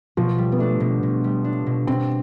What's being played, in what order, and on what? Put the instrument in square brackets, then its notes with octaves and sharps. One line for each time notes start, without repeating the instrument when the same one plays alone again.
[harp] B2 [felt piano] F3
[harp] G3
[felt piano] B3
[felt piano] A3 [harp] D4
[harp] B2
B2
G3
D4
B2
[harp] B2 [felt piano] C4